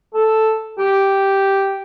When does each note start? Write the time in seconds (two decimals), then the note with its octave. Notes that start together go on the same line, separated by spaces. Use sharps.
0.14 A4
0.79 G4